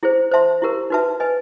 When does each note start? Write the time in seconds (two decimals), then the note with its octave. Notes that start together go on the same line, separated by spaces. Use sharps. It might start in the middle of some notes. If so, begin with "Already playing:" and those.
0.03 E4 G#4 C5
0.32 C5 E5 A5 C6
0.62 E4 G4 A#4
0.90 D#4 F#4 B4 E5 A5
1.20 B4 D#5 G#5